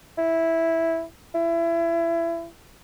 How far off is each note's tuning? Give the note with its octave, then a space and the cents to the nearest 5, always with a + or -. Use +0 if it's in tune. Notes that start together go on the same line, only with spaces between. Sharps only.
E4 -5
E4 +25